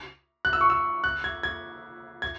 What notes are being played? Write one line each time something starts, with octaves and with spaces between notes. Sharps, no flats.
F#6
E6
C#6
E6
F#6
G#6
G#6
G#6